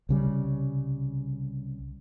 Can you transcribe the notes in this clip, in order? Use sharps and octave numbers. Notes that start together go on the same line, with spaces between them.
C2 C#3 G3